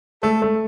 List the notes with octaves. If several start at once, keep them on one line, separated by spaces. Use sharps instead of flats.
A3 A4
A3